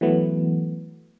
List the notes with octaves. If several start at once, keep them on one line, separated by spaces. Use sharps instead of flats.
E3 F#3 A3 B3